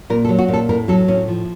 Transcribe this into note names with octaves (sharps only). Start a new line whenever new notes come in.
A#2 A#4
A4
F#3
F#4
A#2
A4
A2 A#4
F#3 A4
A2 C#4
F3